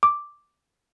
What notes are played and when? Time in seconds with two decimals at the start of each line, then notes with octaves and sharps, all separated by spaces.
0.03 D6